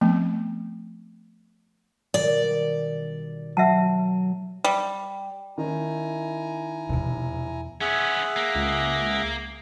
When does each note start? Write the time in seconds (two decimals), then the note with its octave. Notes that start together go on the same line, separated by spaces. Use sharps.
0.01 F3 A3 B3 C4
2.14 B2 D#3 G3 D5
3.57 F#3 E5 F#5 A5
4.64 G3
5.58 D#3 C#4 D#4 E4 G#5 A#5
6.89 F1 E2 B2
7.81 B3 C#4 G#4 E5 F#5
8.36 A#3
8.55 C#2